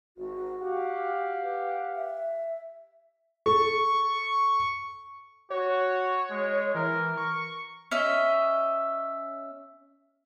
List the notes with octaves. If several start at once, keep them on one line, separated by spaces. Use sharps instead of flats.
G#1 F#4
G4 F5 F#5
B4
E5
A4 C#6
F#4 C#5
G#3
E3 A#4
C#6
C#4 D#5 E5